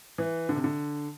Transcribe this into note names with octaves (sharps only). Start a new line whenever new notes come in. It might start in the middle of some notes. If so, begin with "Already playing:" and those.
E3
D3
C3
D3